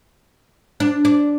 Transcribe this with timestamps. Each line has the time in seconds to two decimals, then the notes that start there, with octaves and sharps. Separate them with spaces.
0.80 D4
1.05 D4